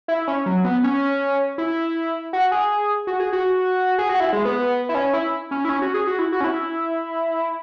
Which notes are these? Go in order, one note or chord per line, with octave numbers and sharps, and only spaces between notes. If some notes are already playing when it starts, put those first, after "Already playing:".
E4
C#4
F#3
B3
C#4
E4
F#4
G#4
F#4
G#4
F#4
G#4
F#4
E4
G#3
B3
E4
C#4
E4
C#4
E4
C#4
F#4
G#4
F#4
E4
F#4
C#4
E4